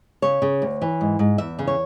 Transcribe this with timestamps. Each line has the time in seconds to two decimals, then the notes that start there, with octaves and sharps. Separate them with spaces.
0.22 C#3 C#5
0.42 C#3
0.62 D2
0.82 E3
1.01 G#2
1.19 G#2
1.38 E2 E5
1.59 C#3
1.67 C#5